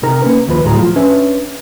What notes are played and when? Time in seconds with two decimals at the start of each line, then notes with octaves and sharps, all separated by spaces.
0.03 C3 D#4 A#4 A#5
0.22 A#3 C#4 B4
0.48 D#2 F3 B4
0.64 D2 A2 F#3 G#4 A#5
0.78 F3 F4
0.96 C#4 D4 B4 C#5 E5